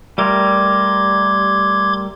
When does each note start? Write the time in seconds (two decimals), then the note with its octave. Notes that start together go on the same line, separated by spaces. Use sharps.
0.18 G3 A3 A#4 C6 D6 G#6